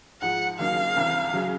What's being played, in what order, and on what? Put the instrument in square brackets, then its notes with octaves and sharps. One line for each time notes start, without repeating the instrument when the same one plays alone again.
[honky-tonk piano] G#2 F3 G#3 [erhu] F#5
[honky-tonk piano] D#2 C#3 F#3 A#3 D#4 [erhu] F5
[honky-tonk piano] C2 C3 E3
C#3 F#3